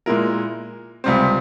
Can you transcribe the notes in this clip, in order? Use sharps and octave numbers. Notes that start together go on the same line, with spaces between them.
A#2 G#3 E4 A#4
C#2 C3 G3 C4